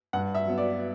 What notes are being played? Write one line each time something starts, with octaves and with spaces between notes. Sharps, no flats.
G2 F#5
E5
F#3 B3
D5